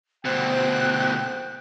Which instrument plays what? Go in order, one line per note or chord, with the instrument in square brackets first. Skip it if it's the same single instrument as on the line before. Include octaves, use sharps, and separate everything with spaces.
[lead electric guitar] D2 B2 [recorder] C5 [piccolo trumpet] G5 [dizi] F#6